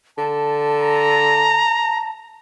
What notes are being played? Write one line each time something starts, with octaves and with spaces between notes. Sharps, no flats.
D3 A5
A#5